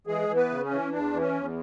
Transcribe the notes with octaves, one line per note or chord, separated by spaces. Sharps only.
E3 G#3 G#4
E3
B3 B4
C#3
C#4
E3
E2 D4
E3
C#4
E2